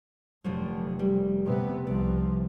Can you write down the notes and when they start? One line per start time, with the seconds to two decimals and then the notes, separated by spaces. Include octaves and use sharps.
0.44 F1 D3 F3 F#3
0.99 G3
1.45 C3 B3
1.87 C2 F3 D5